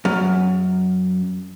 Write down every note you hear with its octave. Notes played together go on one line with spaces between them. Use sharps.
F#2